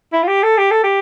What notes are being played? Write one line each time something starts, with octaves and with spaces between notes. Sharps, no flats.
E4
F4
G4
A4
G4
A4
G4